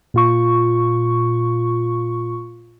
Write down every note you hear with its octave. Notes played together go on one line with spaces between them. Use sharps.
A#2 F4 C#6